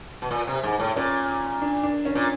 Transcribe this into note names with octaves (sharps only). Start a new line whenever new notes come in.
B2
A#2
C3
G#2
A2
A#2 C#4
D4
D4
C#4
A#2